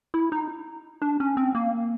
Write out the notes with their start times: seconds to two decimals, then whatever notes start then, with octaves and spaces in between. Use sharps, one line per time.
0.14 E4
0.32 D#4
1.02 D4
1.20 C#4
1.37 C4
1.55 A#3